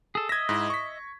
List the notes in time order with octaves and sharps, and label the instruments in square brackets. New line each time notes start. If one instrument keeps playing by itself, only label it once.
[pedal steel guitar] G#4 A4
[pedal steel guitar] D#5 E5 [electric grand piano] G#6 A#6
[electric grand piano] G#2 E4
C#6 B6